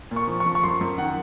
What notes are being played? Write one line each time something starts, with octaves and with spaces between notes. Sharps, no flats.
A#2
C#6
F3
C#6
F3
C#6
F#2 C6
F#2
D#3 F#5